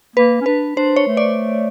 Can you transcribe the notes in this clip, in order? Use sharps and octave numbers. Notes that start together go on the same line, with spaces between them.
A#3 B4
C#4
D4 B4
D4 C5
C#5
A3
D5